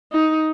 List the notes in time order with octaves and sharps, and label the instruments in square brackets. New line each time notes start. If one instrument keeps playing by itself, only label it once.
[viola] D#4